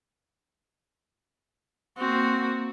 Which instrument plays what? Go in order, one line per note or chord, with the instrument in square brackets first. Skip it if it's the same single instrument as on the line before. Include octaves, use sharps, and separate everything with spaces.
[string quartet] A#3 F#4 [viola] C4